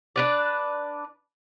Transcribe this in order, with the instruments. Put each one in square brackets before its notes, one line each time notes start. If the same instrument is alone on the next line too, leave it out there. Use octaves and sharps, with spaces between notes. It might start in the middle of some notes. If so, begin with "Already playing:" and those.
[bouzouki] D4 B4 D5